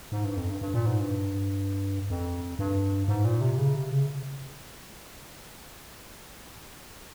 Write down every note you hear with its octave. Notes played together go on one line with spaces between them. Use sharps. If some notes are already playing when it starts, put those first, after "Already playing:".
G#2
G2
F2
G2
G2
A#2
G#2
G2
F2
G2
G#2
A#2
C3
C#3
C3
C#3